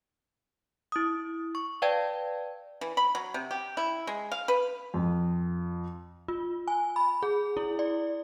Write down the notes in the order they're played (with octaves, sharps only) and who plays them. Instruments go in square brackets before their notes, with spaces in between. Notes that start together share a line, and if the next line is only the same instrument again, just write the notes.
[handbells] E4 D#6
C#6
B4 D5 F5 G5 A5 G#6
[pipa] E3
B5
F#3
C3
G4
E4
G#3
F5
B4
[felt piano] F2
[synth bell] F4
G#5
B5
G#4
E4
D5